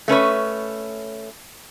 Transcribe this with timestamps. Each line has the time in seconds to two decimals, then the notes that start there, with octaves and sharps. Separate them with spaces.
0.08 A3 C#4 B4 C#5